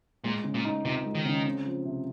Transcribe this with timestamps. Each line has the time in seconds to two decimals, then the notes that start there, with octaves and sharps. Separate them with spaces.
0.24 A#2 G#3
0.44 C#3
0.54 A#2
0.65 D#4
0.85 C#2 C3
1.05 G#3
1.15 D#3
1.25 C#3
1.45 C4
1.66 F3
1.85 C3